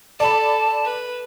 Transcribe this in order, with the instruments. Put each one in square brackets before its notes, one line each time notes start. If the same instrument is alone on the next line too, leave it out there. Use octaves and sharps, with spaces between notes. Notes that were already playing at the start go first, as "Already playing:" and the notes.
[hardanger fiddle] A4 [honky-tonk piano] D5 B5 [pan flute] A5
[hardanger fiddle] B4